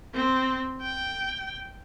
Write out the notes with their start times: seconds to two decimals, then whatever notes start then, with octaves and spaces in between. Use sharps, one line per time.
0.14 C4
0.82 G5